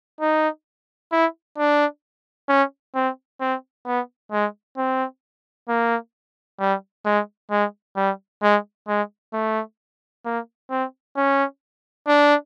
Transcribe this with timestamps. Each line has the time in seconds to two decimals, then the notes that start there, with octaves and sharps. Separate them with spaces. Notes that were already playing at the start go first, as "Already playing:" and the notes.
0.21 D#4
1.12 E4
1.58 D4
2.49 C#4
2.95 C4
3.41 C4
3.86 B3
4.32 G#3
4.77 C4
5.69 A#3
6.60 G3
7.06 G#3
7.51 G#3
7.96 G3
8.42 G#3
8.88 G#3
9.33 A3
10.25 A#3
10.70 C4
11.17 C#4
12.07 D4